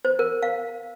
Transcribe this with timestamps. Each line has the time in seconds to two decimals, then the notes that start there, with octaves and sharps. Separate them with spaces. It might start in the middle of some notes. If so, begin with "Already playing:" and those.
0.05 C5
0.19 A#4
0.42 F5